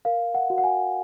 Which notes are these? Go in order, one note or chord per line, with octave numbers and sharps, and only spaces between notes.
A#4 F5
F#5
F#4
F#5
G#5